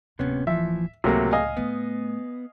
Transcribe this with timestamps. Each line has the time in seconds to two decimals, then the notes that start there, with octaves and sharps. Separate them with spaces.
0.19 D1 C3 A#3 B3 C#4
0.47 E3 F3 E5
1.04 C#2 A2 C3 F#3 A3 A#3 G#4
1.33 D#5 F5 G#5
1.57 A2 A3 B3